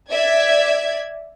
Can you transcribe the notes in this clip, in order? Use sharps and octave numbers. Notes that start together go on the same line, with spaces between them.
D5 E5 G#6